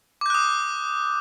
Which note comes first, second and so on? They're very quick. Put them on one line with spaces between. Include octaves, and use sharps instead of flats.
D6 G6 F#6 D#6